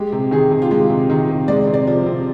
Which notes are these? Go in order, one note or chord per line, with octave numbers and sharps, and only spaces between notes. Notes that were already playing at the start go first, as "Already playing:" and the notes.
Already playing: G#3 G4
C3
D#3 G#4
C3
F4
G#3 G4
C3
D#3
C3
G#3 D5
C3
D5
F3
C3